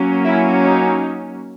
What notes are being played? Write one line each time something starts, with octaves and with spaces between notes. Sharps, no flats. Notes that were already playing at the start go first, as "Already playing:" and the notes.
Already playing: F#3 A#3 C#4
E4
D#4